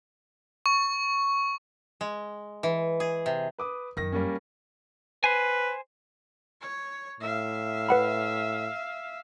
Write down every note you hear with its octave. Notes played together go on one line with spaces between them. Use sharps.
C#6
G#3
E3
G#4
C3
B4 D6 D#6
F#2 D#3 A#6
G3 A#3 C#4
B4 C5 G#5
C#5
A2 E5 F5
B4 F#5 B5